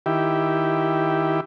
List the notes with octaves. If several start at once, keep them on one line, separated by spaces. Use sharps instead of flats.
D#3 E4 G4